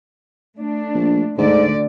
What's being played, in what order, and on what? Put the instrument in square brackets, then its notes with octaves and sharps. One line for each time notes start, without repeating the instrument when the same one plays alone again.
[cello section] A3 D4
[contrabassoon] A#1
[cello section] D2 D3 D5 [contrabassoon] G#2